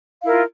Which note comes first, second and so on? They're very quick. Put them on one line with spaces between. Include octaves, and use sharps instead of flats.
F5 E4 A#4 F4